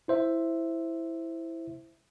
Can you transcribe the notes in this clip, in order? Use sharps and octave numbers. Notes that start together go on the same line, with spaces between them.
E4 C5 E5